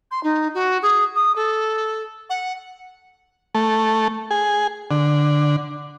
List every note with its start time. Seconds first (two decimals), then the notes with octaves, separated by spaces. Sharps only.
0.11 C6
0.23 D#4
0.54 F#4
0.82 G#4
1.16 D#6
1.36 A4
2.30 F#5
3.55 A3
4.31 G#4
4.91 D3